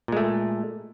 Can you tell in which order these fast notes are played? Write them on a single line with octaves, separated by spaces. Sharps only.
A#2 G#3 A3